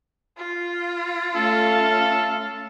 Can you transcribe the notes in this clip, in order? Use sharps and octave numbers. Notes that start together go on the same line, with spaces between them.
F4
A3 C#4 A4 F5